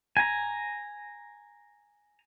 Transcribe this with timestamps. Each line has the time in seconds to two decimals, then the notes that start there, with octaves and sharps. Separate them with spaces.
0.17 G#5 A#5